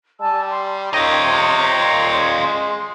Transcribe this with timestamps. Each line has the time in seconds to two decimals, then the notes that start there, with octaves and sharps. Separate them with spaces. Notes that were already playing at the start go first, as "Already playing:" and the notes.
0.21 G3 G#5 A5 E6
0.51 C6
0.94 D#3 F4 C#5 D#5 G5 A#5
1.23 C3
1.82 A#2
2.44 G#3